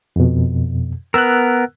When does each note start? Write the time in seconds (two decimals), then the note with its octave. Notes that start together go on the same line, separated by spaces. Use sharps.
0.16 F2 B2
1.14 B3 A#4 E6 F#6